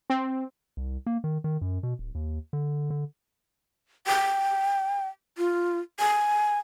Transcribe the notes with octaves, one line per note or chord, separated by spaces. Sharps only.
C4
C2
A#3
D#3
D#3
F#2
B2
D1
D#2
D3
D3
G5
F4
G#5